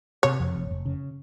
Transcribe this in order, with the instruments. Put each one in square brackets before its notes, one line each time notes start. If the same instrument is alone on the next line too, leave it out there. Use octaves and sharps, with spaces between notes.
[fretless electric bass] C3 [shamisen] C#5
[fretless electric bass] F2
F1
F1
C#3